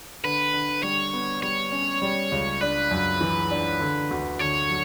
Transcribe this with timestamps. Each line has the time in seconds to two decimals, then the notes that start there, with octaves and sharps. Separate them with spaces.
0.24 D3 B4
0.53 D3
0.83 G3 C#5
1.13 B3
1.42 G3 C#5
1.72 C#4
2.02 G3
2.32 C#2
2.61 D4 B4
2.91 F#2
3.21 E3
3.51 D4
3.80 D3
4.11 D2
4.39 D3 C#5
4.69 F#3